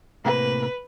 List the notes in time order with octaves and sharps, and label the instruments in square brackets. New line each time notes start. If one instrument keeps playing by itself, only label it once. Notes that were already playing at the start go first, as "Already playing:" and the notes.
[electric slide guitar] A2 C3 A#3 [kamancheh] B4